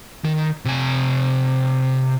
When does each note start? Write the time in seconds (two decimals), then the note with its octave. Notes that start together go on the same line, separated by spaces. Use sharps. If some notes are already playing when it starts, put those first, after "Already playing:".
0.24 D#3
0.65 C3 G#5